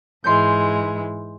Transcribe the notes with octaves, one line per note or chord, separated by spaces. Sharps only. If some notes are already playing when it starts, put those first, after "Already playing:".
G#2 E3 G#3 C6 G6